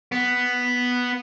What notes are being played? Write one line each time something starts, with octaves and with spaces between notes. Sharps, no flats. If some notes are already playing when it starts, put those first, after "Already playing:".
B3